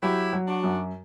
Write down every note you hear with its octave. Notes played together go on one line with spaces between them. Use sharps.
F#3 E4 G4
F#3
D4 F#4
F#2